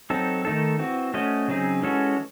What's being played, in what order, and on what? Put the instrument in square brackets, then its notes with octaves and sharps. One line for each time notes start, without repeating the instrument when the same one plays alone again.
[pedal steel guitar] F#3 C4 D#4 A4
D#3 A3 D#4 A4
E3 C4 F#4
A3 C#4 F#4 C5 D#5
C#3 F#3 C4 D#4 G#4
E3 G#3 C#4 F#4 A4